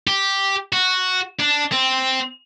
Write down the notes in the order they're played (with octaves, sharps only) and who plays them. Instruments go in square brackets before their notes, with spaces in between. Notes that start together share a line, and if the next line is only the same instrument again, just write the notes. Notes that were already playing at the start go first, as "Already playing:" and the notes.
[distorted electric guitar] G4
F#4
D4
C4